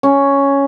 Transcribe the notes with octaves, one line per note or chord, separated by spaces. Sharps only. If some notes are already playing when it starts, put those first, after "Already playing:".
C#4